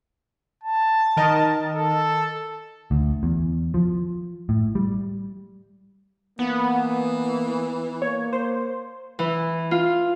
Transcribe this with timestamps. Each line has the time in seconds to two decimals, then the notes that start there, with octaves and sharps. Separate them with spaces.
0.63 A5
1.17 D#3 A#4 D#5
1.76 A4
2.91 D2
3.23 E2
3.74 F3
4.49 A2
4.75 G3
6.39 E3 A#3 B3
8.02 A#3 C#5
8.33 C5
9.19 E3
9.71 F4